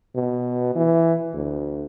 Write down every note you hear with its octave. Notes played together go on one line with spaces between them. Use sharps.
B2
E3
D2